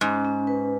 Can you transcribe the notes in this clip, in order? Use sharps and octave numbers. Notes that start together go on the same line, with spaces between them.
G#2 C#4
C#4
B4